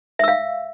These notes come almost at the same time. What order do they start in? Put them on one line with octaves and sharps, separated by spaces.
E5 E6 F5